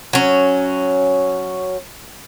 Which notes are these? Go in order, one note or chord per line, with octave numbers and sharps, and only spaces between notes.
F#3 C#4